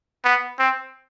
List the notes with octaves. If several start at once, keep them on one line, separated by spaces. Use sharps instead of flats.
B3
C4